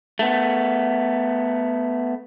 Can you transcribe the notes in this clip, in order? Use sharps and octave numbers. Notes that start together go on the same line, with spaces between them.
A3 B3